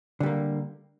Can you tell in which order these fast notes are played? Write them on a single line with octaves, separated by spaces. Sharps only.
D3 G3 A#3